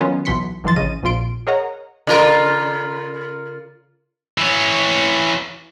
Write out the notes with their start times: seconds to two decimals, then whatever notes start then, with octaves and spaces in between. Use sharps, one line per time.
0.01 D#3 F#3 B3 C#4 D#4 F4
0.25 B1 B2 E3 C6 B6 C#7
0.64 G1 E3 F3 C6 A6
0.76 A1 C#3 C#4 D#5 D#7
1.03 A#1 F2 A#2 F4 C6 D7
1.47 G#4 A#4 C#5 D#5 F#5 A#5
2.07 C#3 F4 A#4
4.38 E3 C#5